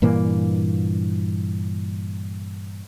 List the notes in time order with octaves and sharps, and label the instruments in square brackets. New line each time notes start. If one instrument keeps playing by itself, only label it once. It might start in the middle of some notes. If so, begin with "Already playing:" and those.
[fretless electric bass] G2 A#2 E3 A#3